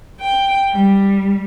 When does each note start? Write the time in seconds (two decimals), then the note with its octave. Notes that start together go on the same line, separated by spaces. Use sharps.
0.19 G5
0.71 G3